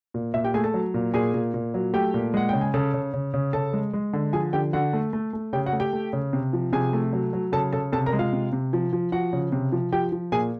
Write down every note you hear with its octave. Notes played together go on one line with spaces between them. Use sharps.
A#2
A#2 E5
G4 G5
A3 G#4 G#5
A4 A5
F#3
A#2
A#2 G#4 G#5
A#2
A#2
F#3
A3 G4 G5
A#2
G#3 F#5
C#3 G5
G#5
C#3 A4 A5
C#3
C#3
C#3
C#3 A4 A5
G#3
G#3
D3
F3 G#4 G#5
D3 G4 G5
D3 F#4 F#5
A3
A3
A3
C#3 G4 G5
F#4 F#5
A3
G4 G5
A3
C#3
C3
F3
C3 G#4 G#5
A3
F#3
F#3
C#3 A4 A5
C#3 A4 A5
C3 A4 A5
A#4 A#5
G#3
F4 F5
C3
C3
F3
F3
F3 F#4 F#5
C#3
C3
F3
F3 G4 G5
F3
A#2 G#4 G#5